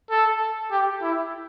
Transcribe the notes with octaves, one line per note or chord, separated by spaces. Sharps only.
A4
G4
E4